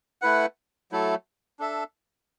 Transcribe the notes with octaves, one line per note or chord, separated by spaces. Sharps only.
A3 E4 B4 F#5
F#3 A3 E4 A4
D4 A4 E5